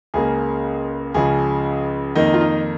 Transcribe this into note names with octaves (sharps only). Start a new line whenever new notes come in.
C#2 C#3 A#3 G#4
C#2 C#3 F3 G#4
F2 D#3 A#3 D#4
F4
D#4